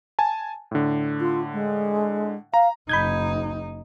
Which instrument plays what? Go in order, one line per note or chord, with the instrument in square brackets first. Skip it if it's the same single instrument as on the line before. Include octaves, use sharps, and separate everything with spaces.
[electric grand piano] G#5 A5
A2 D3
[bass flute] F4
G#3
[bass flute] F5 [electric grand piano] A#5
[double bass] F#1 D#4 [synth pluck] B5 G6 G#6